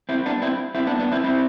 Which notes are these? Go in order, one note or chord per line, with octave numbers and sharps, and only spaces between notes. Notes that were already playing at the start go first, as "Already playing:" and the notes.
C4 E4
B3 D4
C4 E4
C4 E4
B3 D4
B3 D4
C4 E4
C4 E4